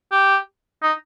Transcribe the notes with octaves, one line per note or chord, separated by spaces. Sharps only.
G4
D#4